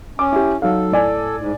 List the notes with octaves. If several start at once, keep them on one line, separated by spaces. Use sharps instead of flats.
C#4 D6
E4 G4
F#3 D#4 A4 F5
A2 D5 G#5
G#2